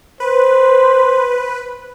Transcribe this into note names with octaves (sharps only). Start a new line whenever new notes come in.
B4 C5